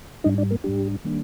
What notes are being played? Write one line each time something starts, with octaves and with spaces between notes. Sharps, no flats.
G#2 G3 D4 D#4 D#5
D4 D5
A#3 A#4
G#2 G3 D4 G4
D#3 G3 A#3 D4